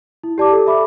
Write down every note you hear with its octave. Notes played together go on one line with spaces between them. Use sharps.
E4
G4 D5 A5 D6
A4
E5 B5 D6